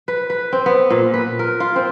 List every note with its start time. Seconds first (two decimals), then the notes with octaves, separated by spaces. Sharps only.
0.08 B4
0.30 B4
0.53 C4
0.66 B3
0.90 A#2
1.14 B4
1.39 A#4
1.60 F4
1.76 C4